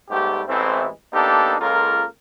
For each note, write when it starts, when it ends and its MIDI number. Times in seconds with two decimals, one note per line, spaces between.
0.10 0.42 44
0.10 0.42 55
0.10 0.42 57
0.10 0.42 59
0.10 0.42 67
0.48 0.88 33
0.48 0.88 52
0.48 0.88 56
0.48 0.88 57
0.48 0.88 60
1.13 1.56 58
1.13 1.56 59
1.13 1.56 62
1.13 1.56 63
1.13 1.56 67
1.13 1.56 69
1.60 2.05 37
1.60 2.05 49
1.60 2.05 58
1.60 2.05 65
1.60 2.05 69
1.60 2.05 70